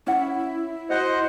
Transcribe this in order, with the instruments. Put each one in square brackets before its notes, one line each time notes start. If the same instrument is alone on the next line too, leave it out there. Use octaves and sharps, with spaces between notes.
[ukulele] C#4 F#5 [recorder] E4
[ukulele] F#4 [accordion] C5 D#5 F#5